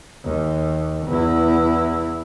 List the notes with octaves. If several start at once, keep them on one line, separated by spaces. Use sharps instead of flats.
D#2
E2 E4